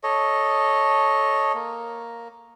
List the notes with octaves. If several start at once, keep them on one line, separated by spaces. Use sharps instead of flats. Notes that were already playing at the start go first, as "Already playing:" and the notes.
A4 C#5 D#5
A#3